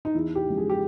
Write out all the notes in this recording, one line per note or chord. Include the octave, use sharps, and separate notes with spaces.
D#4
E2 E4
G4
C#3 F3 G#3
G#4
G4